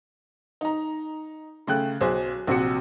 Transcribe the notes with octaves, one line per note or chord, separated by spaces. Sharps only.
D#4 A#5
C#3 A3 G5 F#6
B1 G#4 C5
A#1 C3 F#4 C#7